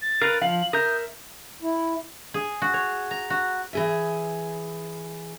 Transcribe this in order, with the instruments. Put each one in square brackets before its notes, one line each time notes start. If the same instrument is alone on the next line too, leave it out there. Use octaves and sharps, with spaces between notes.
[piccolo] A6
[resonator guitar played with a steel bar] A#4 [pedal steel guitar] B4 F5
[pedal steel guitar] F3 [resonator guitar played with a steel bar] F5 [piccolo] F#7
[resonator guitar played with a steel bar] A#4 [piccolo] E5 [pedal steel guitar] D#6 G6
[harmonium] E4
[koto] G#4
F#4
C#5
A#5
F#4
[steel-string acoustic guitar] E3 G#4 E5